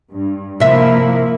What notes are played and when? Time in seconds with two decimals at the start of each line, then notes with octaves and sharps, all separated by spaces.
0.10 G2
0.60 C3 F3 A#3 E4 E5